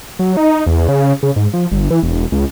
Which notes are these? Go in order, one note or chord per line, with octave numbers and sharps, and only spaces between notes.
F#3
D#4
E2
C#3
C#3
G#2
F3
G1
E3
E1
C#2